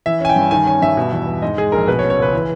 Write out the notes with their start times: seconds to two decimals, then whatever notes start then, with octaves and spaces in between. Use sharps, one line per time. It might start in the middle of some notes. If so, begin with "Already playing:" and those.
0.06 E3 E5
0.21 C#4 G#5
0.29 G5
0.36 G2
0.51 D#3 G#5
0.67 C#4 G#5
0.82 G2 E5
0.97 B2
1.12 E2
1.27 E2
1.42 G#2 D#5
1.58 G#3 G#4
1.72 A#1 A#4
1.87 B2 B4
1.99 C#5
2.03 C#4
2.10 C#5
2.18 C#2 B4
2.33 E3